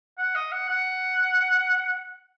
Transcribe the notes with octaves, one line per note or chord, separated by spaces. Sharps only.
F#5
D#5
F#5
F#5